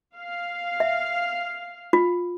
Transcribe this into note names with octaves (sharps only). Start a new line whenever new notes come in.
F5
E5
F4